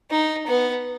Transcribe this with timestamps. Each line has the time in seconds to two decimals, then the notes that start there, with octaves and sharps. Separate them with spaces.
0.10 D#4
0.47 B3